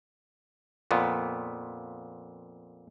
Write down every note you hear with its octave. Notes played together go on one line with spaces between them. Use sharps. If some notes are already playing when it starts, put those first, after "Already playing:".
F2 A#2 B3